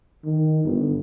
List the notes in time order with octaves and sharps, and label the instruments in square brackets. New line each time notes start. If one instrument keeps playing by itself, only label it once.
[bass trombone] D#3
G1